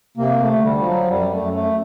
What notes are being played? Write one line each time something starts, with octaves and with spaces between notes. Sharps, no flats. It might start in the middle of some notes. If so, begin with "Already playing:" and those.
C3 A#3
A3
D2
G3
F3
F#3
F#2 G3
A3
F#2
A3